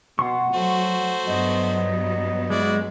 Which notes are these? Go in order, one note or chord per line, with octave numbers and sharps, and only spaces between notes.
B2 F#5 C6 C#6
F#3 A3 F#4 C5
G2 F#3 B3 D#5
G#3 E4 F#4 D5